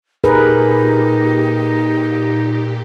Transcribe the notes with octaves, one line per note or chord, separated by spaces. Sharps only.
A#2 D#4 G4 G#4 A#4 B4